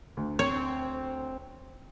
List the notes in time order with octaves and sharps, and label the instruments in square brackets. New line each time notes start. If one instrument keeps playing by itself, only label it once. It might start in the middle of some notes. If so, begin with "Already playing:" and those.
[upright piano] D2
[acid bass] C4 [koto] C#5